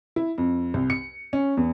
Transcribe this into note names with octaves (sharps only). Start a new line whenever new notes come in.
E4
F2
C2
C#7
C#4
E2